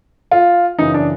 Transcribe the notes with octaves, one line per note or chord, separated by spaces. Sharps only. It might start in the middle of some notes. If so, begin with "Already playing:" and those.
F4
F#2 C#3 E3 D#4
D4